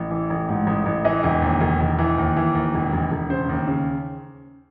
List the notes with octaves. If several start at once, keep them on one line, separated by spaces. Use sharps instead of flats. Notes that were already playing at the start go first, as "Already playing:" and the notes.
Already playing: A1
E3
A1
G#2
A1
A1
E3 D#5
E1
D#2
E1
E1
E3
D#2
E3
D#2
E1
E1
E1
C#3 C5
D#2
C#3